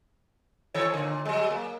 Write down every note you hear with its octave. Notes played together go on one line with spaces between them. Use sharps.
E3 A4 C#5
A#2 D3
F#3 G#3
A#3